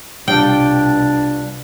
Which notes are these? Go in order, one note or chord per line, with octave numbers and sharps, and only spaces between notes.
C2 B2 G3 D4 F4 D5 G5